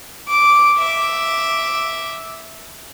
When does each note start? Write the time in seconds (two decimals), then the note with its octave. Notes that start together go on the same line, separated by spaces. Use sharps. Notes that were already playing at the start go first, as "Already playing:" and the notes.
0.28 D6
0.78 E5 D6